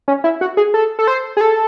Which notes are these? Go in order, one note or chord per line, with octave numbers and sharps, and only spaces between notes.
C#4
E4
F#4
G#4
A4
A4
C5
G#4
A4